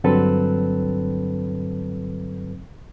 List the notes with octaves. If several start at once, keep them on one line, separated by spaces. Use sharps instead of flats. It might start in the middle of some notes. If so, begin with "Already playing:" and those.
G2 D3 F#3 C4 A4 B4